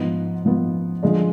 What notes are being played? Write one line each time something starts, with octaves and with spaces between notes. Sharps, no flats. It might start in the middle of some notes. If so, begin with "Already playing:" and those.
Already playing: G#2 F3 B3
G#2 F3 B3
D3 F3 G#3 D4